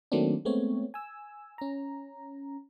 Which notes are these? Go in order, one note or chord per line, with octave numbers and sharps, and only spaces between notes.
D#3 F#3 A3 A#3 C4 D4
G#3 A3 B3 C4 C#5
G#5 E6
C#4 A#5